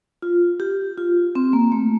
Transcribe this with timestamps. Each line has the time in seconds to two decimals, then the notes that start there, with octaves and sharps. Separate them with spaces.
0.22 F4
0.60 G4
0.98 F4
1.35 C4
1.53 A#3
1.72 A3